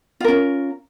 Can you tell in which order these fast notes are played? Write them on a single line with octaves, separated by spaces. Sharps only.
F4 A#4 C#4